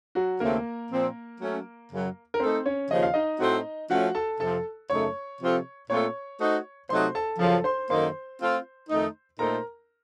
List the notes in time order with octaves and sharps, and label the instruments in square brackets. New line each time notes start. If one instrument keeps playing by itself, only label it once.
[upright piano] F#3 F#4
[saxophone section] D#2 C#3 A3 C4 [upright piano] A#3 A#4
[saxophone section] A#2 F3 C4
F#3 A3 C#4
F#2 C#3 F#3
[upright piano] A#4
[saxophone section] A3 D#4 A4 [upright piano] C4 C5
[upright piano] C#4 C#5
[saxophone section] D#2 C#3 F3 [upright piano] D#5
[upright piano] F5
D#4 D#5
[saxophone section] A2 A3 C4 F#4 C5
[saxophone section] F3 A3 C#4 [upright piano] F#4 F#5
[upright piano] A4 A5
[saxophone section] F2 C3 F3 C4 [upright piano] A4 A5
[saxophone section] F#2 C#3 A3 D#4 [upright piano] C#5 C#6
[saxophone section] C3 F3 C4 F4 A4
[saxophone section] A#2 A3 C4 F4 A4 [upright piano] C#5 C#6
[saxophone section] A3 D#4 F#4 C5 D#5
[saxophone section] C3 F#3 A3 D#4 F#4 [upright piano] C5 C6
[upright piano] A4 A5
[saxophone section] F#2 C#3 F3 [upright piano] A4 A5
[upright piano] C5 C6
[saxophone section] F#2 D#3 A#3 D#4 A4 [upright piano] C5 C6
[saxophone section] A3 C4 F4
F2 D#3 A3 D#4
[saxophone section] A#2 A3 D#4 A4 C5 [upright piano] A#4 A#5